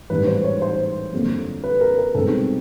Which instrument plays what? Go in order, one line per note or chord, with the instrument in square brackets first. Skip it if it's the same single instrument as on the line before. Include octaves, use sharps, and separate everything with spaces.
[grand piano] A1 G#2 D#3 G3 B4
C5
C#5
C5
G1 F2 D3 F#3 A#3
B4
A#4
A#4
C2 B2 G#3 C4 D#4 A4